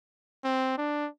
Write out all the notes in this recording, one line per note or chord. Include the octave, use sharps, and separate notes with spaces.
C4
D4